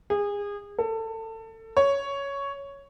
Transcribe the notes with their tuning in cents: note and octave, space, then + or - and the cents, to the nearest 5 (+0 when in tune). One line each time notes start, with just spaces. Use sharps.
G#4 -30
A4 +25
C#5 +5